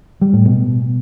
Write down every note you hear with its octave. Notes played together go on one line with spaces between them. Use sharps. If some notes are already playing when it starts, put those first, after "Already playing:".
G3
A2
B2